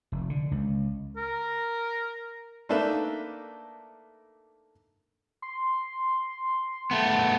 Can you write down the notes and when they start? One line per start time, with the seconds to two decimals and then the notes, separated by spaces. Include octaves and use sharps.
0.12 F1
0.30 D3
0.51 C#2
1.17 A#4
2.69 A3 A#3 D4 D#4 B4 E5
5.42 C6
6.91 A3 B3